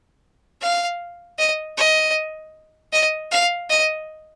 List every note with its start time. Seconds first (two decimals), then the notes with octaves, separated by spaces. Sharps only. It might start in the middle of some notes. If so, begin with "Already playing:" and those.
0.62 F5
1.38 D#5
1.77 D#5
2.93 D#5
3.31 F5
3.70 D#5